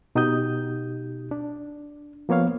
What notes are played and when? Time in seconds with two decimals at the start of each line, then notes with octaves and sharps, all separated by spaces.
0.15 B2 D#4 F#4 G4 D#6 G6
1.31 D4
2.29 F3 A#3 B3 C#5 F5